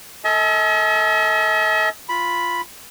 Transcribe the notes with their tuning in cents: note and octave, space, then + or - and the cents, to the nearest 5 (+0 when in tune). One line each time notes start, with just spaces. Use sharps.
A4 +20 D#5 +45 G#5 +45
F4 +0 B5 +0